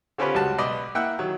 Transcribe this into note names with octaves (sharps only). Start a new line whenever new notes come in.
D3 C4 C#4 F4 G4 B4
C#2 G3 F#4 A5
B1 B4 D5 D#5
A#3 E4 F#5 G5 E6 F#6
D#3 F#3